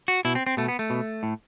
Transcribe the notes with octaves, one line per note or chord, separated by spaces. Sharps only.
F#4
B2 E4
C4
C4
B2 A3
B3
A3
B2
A2